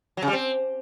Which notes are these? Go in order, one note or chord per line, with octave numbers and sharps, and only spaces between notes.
F#3
C#3
G3
C4